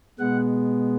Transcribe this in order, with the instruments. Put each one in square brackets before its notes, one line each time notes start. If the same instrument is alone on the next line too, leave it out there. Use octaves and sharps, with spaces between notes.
[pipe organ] B2 G#3 B3 F#5